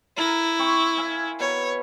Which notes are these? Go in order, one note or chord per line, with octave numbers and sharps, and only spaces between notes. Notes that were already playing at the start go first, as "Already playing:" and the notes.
E4 A4 A#4 A5
C4 C6 C#6
E5 F5 G#5
B2 C#5 B5